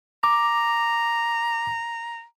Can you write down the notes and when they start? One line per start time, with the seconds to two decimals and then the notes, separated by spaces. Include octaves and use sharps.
0.24 A#5 D6